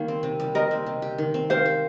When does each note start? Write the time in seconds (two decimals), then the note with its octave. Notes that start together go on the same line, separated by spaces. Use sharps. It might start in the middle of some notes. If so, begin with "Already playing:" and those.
Already playing: D#3 G3 A#3 F5
0.08 C4
0.23 C3
0.40 G3
0.55 C3 A#4 D#5
0.71 C4
0.86 C3
1.02 G4
1.18 D#3
1.34 C4
1.50 A#4 C5 F5
1.66 G4